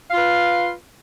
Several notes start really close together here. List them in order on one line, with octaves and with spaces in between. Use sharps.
F5 F4 B4